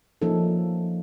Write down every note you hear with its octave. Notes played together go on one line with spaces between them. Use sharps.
F3 A#3 C#4 D#4 A4